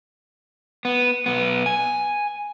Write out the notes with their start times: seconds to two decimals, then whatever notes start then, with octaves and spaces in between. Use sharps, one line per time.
0.85 B3
1.26 B1 B3
1.66 G#5